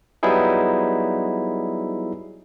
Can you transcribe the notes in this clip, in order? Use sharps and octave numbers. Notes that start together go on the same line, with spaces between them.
F#3 G3 B3 D#4 E4 G#4